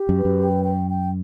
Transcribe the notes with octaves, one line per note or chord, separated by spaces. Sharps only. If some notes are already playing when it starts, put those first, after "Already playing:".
Already playing: G4
F#2
B4
F#2
G5
G5
G5